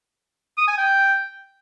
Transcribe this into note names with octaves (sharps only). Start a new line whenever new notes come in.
D#6
G#5
G5